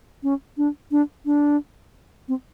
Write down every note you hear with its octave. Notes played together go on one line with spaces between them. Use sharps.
C#4
D4
D4
D4
C4